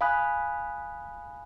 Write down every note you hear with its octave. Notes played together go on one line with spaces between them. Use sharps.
F5 G#5 B5 D#6 F#6